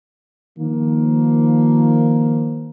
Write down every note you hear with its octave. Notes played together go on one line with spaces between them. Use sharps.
D#3 F3 A#3